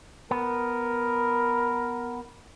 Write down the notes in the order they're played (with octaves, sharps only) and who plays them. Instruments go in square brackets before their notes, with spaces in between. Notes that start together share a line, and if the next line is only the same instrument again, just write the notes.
[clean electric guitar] B3 [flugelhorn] A#4